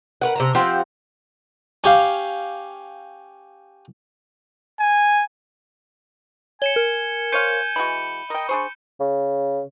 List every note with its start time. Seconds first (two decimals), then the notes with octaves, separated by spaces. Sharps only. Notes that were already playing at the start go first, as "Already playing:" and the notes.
0.21 A#4 B4 F#5
0.36 C3 A5 A#5
0.55 F3 C4 G4 F#5
1.84 C#4 G4 F5
4.80 G#5
6.62 C#5 G#5 C#7 E7 G7
6.76 A#4
7.32 C5 C#5 F5 G6 C#7 D#7
7.76 E3 G#3 F#4 B5
8.30 A#4 D#5 G5
8.49 D4 G#4 C5 C#6
9.00 C#3